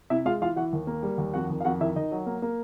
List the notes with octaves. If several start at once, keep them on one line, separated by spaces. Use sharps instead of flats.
C3 E4 E5
G#3 F4 F5
E3 F4 F5
E3 F#4 F#5
D#2
A#3
G3
D#2
F2 F#4 F#5
D#3
F5
F2 F#4 F#5
D#3 E4 E5
D#3 D#4 D#5
F#3
A#3
A#3